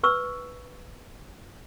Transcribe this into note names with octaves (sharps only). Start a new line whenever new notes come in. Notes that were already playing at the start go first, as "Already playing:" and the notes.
B4 C#6 E6